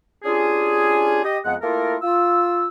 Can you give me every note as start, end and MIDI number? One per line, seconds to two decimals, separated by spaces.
0.24 1.22 61
0.24 1.22 62
0.24 1.22 65
0.24 1.22 67
0.24 1.22 68
1.24 1.38 67
1.24 1.38 75
1.45 1.55 41
1.45 1.55 56
1.45 1.55 59
1.45 1.55 75
1.45 1.55 78
1.61 1.96 57
1.61 1.96 58
1.61 1.96 64
1.61 1.96 65
1.61 1.96 69
1.61 1.96 70
2.02 2.67 65
2.02 2.67 88